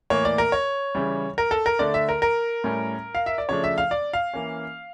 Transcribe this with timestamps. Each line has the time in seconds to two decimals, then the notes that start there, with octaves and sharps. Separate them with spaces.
0.10 A2 E3 A#3 C#5
0.25 D5
0.38 A#4
0.52 C#5
0.95 C#3 E3 G3
1.38 A#4
1.51 A4
1.66 A#4
1.79 D3 A3 D4 D5
1.94 E5
2.09 A#4
2.22 A#4
2.64 A2 G3 C#4
3.15 F5
3.26 E5
3.38 D5
3.49 C#3 F3 A3 D4 C#5
3.64 E5
3.78 F5
3.91 D5
4.13 F5
4.33 E3 A#3 C#4